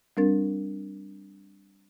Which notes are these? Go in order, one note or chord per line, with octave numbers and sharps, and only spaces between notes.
G3 C4 D4 A#4 A6